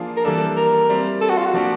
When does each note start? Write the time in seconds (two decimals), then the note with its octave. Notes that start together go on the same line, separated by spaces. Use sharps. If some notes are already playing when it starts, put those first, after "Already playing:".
Already playing: F3 A#3 D4 F4 G#4
0.16 A#4
0.24 E3 G3 A#3 D4 A4
0.56 A#4
0.89 G3 C4 E4
1.21 A4
1.29 F#4
1.38 F4
1.46 F#4
1.54 F3 A#3 D4 G4